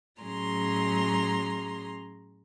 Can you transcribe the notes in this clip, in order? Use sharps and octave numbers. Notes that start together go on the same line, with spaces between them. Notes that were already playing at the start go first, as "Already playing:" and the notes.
A2 F#3 C#4 G#4 A#5 C6